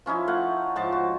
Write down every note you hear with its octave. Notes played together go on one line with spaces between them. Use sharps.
F3 C#4 D#4 E4
A3 F5 F#5
G#2 F3 A5
F#4